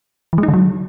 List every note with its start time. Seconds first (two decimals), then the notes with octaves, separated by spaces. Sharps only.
0.33 E3
0.38 G#3
0.43 D#4
0.48 D3
0.54 F#3